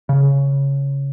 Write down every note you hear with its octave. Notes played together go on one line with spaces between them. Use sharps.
C#3